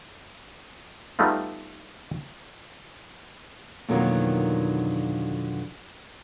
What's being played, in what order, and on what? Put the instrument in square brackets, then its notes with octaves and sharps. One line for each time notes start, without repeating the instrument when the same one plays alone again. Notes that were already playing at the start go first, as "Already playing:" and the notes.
[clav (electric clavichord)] G3 A3 B3 D#4 F4
[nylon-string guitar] F2 B2 D3 D#3 F#3 A#3